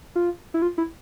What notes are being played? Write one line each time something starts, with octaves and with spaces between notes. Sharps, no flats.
F4
E4
F4
E4